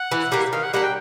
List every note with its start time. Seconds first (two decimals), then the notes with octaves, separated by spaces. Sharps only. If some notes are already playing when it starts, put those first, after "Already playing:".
Already playing: F#5
0.12 E3
0.32 G3 A#3
0.53 D#3 F5
0.63 F#5
0.74 G3 A#3 D4 F#5
0.83 G5